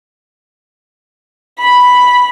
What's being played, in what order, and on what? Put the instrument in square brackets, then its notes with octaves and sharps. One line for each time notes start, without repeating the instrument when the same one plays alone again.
[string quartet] B5